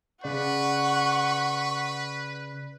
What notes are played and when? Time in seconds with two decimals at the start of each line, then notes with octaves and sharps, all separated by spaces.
0.24 C#3 B4 D5 F#5 C#6